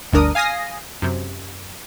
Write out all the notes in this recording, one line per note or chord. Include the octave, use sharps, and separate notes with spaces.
G1 D2 D4 A#4 D#6
F5 G#5 D#6 A#6 C7
F#2 C3